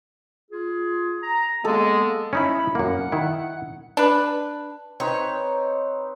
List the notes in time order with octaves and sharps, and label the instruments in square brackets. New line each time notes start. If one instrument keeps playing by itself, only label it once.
[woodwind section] F4 G#4
A#5
[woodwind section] F#3 A#3 B3 [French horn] G#3 [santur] A4
[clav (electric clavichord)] C#4 D#4 E4 [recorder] B5
[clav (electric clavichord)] F#2 A#3 [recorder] F#5
[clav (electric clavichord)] D#3 E4
[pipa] D4 B4
[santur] C4 D#4 B4 [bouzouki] C#5